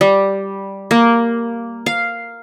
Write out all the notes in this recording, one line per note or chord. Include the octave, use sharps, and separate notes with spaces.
G3
A#3
F5